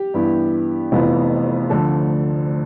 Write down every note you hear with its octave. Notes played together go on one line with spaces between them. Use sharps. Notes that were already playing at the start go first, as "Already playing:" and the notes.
Already playing: G4
G2 E3 B3 E4
F1 F2 E3 B3 F4
D2 D3 F3 A4